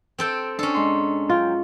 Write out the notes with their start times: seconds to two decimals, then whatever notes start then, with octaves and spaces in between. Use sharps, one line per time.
0.18 C4 A4 G5
0.59 C#4 D4 A4
0.75 G#2 C6
1.30 F#3 F4 G5